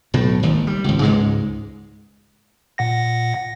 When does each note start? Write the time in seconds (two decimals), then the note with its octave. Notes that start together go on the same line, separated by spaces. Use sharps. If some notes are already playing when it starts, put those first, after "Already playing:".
0.14 B1 A2
0.43 G#1 D#2
0.67 G3
0.84 G#1 C#2
1.02 C#2 G#2 G#3
2.78 A#2 F#5 A#6